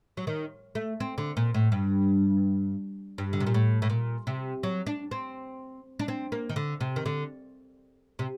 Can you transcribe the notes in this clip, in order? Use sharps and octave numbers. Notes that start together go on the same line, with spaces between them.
F#3
D#3
A3
C4
D3
A#2
A2
G2
G2
D3
C3
A#2
A2
A2
A#2
C3
F#3
D4
C4
D4
C4
A#3
D#3
D3
C3
D#3
D3
C3